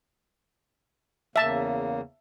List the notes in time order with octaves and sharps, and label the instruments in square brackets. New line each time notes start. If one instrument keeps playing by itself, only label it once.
[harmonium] E2 C#3 A#3 [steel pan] E5 A5